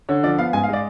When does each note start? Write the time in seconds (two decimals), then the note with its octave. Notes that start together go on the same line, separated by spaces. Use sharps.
0.09 D3 C#5
0.23 F3 D5
0.38 B3 F5
0.53 G#2 G#5
0.63 F5
0.68 G#3 D5